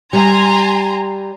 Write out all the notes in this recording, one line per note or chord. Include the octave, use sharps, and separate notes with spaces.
G3 G#5 A#5 C6